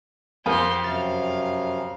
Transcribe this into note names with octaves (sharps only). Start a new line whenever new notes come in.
F2 G4 A#4 F5 G#5 C6
F#2 C3 F#3 F5 A6